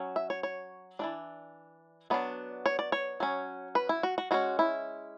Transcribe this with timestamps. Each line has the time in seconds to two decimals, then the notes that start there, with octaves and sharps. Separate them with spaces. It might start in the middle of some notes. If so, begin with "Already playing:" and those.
Already playing: F#3 C#4
0.16 E5
0.30 C#5
0.43 C#5
0.99 E3 A3 D4 D5
2.10 F#3 B3 D4
2.66 C#5
2.79 D5
2.92 C#5
3.20 F#3 C#4
3.75 B4
3.89 E4
4.03 F#4
4.18 F#4
4.31 G#3 C#4 F#4
4.59 E4